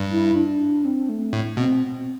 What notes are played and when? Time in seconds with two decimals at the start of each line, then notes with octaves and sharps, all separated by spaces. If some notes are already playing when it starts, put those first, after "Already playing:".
Already playing: G2
0.12 E4
0.36 D4
0.85 C4
1.09 A3
1.33 A2
1.57 B2 C4